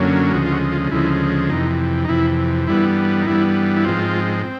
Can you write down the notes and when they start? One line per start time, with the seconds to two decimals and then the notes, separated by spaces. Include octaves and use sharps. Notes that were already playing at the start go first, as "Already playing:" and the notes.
Already playing: F#2 D3 F#3 A#3 C#4
0.33 D2 C#3 F3 G#3 F#4
0.46 F4
0.52 F#4
0.72 F4
0.92 D2 C#3 F3 G#3 E4
1.50 F2 C3 E3 D#4
2.05 D#4
2.09 F2 C3 E3 E4
2.67 G2 E3 G3 B3 E4
3.22 D#4
3.26 G2 E3 G3 B3 E4
3.76 E4
3.85 G#2 F3 G#3 C4 F4
4.43 C4